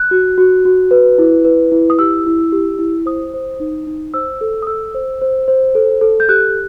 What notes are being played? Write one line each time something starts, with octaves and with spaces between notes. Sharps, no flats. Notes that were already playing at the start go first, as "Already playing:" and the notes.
Already playing: F#6
F#4
F#4
F#4
B4
E4
B4
E4
D#6
G4 E6
E4
G4
E4
C5 D#6
C5
D#4
D#4
C5 E6
A4
D#6
A4 E6
C5
C5
C5
A4
A4
G6
G4 F#6